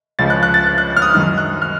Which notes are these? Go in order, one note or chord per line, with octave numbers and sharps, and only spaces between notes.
C#2 C#3 F3 A6
F#6
F#6
A6
F#6
F#6
F6
D#6
F#2 D#3 F6
F#6
F6